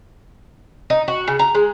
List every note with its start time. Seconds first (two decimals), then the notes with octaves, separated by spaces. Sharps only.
0.90 D#4
1.08 F#4
1.28 C#3
1.39 A#5
1.55 G#3